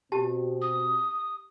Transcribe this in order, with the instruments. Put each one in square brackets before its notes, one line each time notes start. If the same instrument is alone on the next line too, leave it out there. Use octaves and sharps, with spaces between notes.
[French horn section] B2 C4 [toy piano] G4 A5
[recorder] D#6